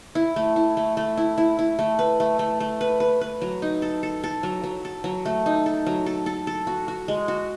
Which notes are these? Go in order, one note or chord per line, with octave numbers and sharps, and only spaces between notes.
E4
A3
E4
A3
A3
E4
E4
E4
A3
B4
A3
A3
A3
B4
B4
B4
F#3
D#4
A4
A4
A4
F#3
F#3
A4
F#3
A3
D#4
A4
F#3
A4
A4
A4
F#4
F#4
G#3
F#4